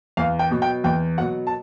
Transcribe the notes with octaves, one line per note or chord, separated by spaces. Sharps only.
E2 F5
G5
B2 F#3
G5
E2 G5
B2 F#3 F#5
A5